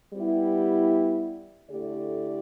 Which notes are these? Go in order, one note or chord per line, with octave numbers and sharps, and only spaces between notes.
G3 B3 E4 G4
D3 A3 E4 G4 D5